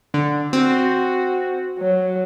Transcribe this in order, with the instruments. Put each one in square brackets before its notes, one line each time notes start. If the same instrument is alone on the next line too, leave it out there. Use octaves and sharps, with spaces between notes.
[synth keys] D3
[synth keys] C4 [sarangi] F#4
[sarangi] F#3